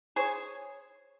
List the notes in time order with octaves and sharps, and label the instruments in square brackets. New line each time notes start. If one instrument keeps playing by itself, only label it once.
[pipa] G#4 C5 C#5